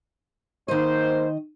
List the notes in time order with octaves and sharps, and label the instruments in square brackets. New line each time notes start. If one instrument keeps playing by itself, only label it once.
[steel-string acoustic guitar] D#3 D#5 [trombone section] A#3 C5